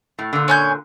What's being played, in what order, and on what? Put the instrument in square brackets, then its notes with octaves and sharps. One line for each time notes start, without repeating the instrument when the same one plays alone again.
[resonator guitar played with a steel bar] A2
A#2 D3
[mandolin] C#4 G#5 G6